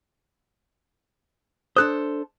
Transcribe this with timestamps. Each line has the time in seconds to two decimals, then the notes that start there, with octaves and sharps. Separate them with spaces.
1.76 D4 A4 C5 D#6 F#6